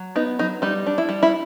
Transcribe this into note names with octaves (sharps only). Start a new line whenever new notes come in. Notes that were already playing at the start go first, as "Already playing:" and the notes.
Already playing: F#3
B3 D#4
F#3 D#4
G3 D#4
D4
E4
G3
E4